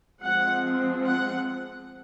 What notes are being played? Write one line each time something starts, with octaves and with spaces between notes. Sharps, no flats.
F3 G#3 C4 F#5
F#5